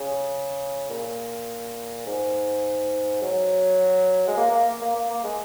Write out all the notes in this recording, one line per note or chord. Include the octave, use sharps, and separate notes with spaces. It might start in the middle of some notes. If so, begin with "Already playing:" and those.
Already playing: C#3
A#2
G#2
F#3
G#3
A#3
A#3
A#3
A#3
A#3
G#3